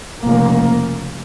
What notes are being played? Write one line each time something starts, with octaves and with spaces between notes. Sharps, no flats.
F1 F2 C#3 A#3